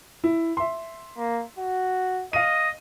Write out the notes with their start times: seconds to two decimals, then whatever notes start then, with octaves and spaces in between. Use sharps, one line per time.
0.24 E4
0.57 E5 C6
1.17 A#3
1.58 F#4
2.33 D#5 F5 D#7